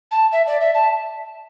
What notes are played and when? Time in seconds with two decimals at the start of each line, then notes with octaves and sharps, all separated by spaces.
0.12 A5
0.32 E5
0.47 D5
0.61 E5
0.75 A5